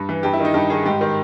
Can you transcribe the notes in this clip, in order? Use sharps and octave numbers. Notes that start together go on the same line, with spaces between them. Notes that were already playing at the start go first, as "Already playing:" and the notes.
Already playing: G2
E3
G2 G4
E4
D#3
D#4
G2 G4
D#3 G#4
G#2 G4
D#3